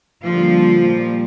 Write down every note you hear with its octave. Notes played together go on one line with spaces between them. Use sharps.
D3 F3 G3 A#3 F4
A#2 G3 A#3